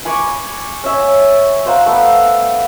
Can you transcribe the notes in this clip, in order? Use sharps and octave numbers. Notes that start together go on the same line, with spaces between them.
G#5 B5 C#6 D6
C#4 E5
C5 F5 F#5 A#5
A3 B3